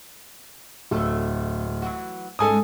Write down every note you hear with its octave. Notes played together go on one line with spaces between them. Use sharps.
D1 E2 A3 A4
E3 F#3 F#4
G#2 G#3 C#4 A4 G#5 D#6